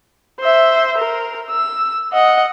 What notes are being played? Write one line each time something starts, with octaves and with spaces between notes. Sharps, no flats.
C5 E5
A#4
E6
D#5 F#5